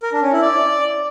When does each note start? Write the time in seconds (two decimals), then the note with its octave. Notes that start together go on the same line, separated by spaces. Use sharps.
0.03 A#4
0.12 D4
0.22 C#4
0.32 E4
0.42 D5